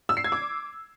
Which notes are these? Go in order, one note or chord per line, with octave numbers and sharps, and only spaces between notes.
E6
C7
G#6
D6